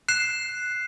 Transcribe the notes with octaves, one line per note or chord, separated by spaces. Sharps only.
F#6 C7 E7